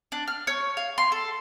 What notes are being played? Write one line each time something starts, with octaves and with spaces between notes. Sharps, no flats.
D4
F6
C#5
F5
C6
A4